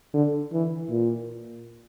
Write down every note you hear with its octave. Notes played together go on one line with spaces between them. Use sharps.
D3
E3
A#2